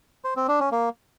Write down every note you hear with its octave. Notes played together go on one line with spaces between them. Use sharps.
C5
C4
D4
C#4
A#3